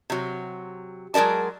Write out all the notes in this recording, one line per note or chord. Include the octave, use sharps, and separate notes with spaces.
C3 F#3
F#3 G#3 A#4 D5 A5